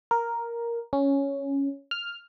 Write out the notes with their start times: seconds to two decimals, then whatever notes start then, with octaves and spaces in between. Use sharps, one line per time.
0.11 A#4
0.93 C#4
1.91 F6